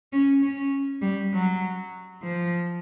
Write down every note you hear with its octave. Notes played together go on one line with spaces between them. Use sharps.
C#4
C#4
G3
F#3
F3